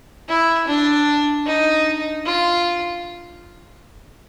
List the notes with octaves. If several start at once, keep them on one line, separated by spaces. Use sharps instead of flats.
E4
D4
D#4
F4